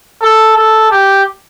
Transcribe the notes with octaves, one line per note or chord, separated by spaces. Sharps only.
A4
A4
G4